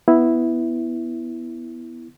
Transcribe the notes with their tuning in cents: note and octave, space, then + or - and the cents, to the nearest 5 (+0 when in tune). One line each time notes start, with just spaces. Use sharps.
B3 +0 E4 +0